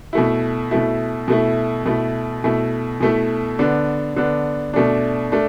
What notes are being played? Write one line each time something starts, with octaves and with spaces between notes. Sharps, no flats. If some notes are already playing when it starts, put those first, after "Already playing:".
B2 A3 E4
B2 A3 E4
B2 A3 E4
B2 A3 E4
B2 A3 E4
B2 A3 E4
D3 B3 D4
D3 B3 D4
B2 A3 D4
A3 D4